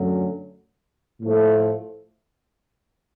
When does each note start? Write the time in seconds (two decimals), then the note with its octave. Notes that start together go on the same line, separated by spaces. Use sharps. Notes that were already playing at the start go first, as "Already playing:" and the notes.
Already playing: F#2 D3 F#3 A3 C#4
1.22 A2 F3 A3